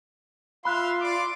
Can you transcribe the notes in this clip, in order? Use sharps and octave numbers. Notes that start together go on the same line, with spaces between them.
F4 E5 F5 B5 C6 F#6
D5 C6 D6